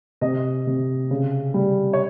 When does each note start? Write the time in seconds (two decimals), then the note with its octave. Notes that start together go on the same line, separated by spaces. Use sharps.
0.21 C3 D#5
0.67 C3
1.11 C#3
1.54 G3
1.93 C#5